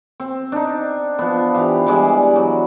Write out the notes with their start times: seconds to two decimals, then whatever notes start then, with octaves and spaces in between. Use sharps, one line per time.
0.20 C4
0.52 D4 D#4
1.18 F3 B3
1.54 E3 G4 F5
1.86 E3 G3 G#3 D5
2.36 F#3